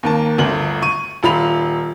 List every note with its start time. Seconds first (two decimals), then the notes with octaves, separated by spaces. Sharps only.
0.03 D#2 A#3 A5
0.38 G1 D2 F#7
0.82 C#6 D#7
1.23 D#1 F4 B5 F7